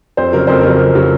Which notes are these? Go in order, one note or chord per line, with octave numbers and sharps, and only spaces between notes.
F2 C5
C#3 F#3 A#4
F2 C5
C#3 F#3 A#4
F2
C#3 F#3